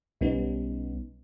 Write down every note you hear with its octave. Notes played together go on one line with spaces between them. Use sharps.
B1 G3 B3 C#4 D#4